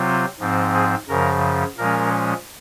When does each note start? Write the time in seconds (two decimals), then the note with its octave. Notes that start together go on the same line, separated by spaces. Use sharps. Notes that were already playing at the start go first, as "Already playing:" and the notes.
Already playing: C3 F#3 C4 F4
0.39 G#2 F3 C4
0.74 G#4
1.08 F#2 C#3 F3 A#4
1.78 A#2 F3 G#3 C#4 A#4